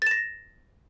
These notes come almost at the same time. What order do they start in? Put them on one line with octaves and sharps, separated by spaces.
A6 E7 A#6